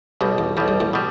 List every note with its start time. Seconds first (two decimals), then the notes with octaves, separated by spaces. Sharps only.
0.21 B1 G2 B2 G3
0.38 E2
0.57 B1 E2 B2 G3
0.68 G2
0.80 E2 A2
0.93 B2 G3